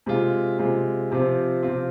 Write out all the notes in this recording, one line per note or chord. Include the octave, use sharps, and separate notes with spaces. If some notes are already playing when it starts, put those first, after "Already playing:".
C3 G#3 F4
C3 G#3 F4
C3 F3 C4 F4
C3 F3 C4 F4